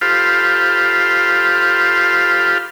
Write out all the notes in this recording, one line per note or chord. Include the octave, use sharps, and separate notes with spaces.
F4 G4 A4 C5 F5 B5